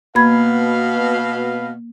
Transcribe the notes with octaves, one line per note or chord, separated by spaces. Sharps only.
B2 A#3 B4 F5 B5 G#6